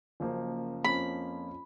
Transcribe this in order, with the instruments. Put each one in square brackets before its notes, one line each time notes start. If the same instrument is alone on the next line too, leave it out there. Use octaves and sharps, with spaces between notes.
[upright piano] F#1 F#2 F3 A#3
[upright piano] F2 F3 A#3 C#4 F4 [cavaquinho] B5